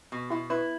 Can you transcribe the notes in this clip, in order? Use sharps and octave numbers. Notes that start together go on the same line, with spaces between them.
B2
B2 E4
E4 B4